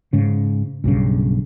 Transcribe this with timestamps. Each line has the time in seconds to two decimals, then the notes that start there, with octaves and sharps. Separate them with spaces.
0.13 G#2 C#3
0.84 B1 G2 C#3